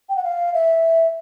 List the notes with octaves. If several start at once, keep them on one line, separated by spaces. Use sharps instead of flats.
G5
F#5
F5
E5